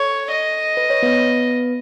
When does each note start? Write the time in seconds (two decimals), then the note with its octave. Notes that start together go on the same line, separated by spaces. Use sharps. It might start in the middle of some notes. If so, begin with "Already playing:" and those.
Already playing: A4 C#5
0.31 D#5
0.77 B4
0.90 C#5
1.02 B3 B4